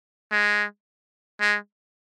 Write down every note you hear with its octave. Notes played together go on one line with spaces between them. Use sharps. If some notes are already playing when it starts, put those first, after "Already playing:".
G#3
G#3